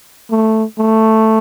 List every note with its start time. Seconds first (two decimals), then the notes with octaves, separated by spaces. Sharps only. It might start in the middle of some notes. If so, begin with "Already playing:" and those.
0.31 A3
0.78 A3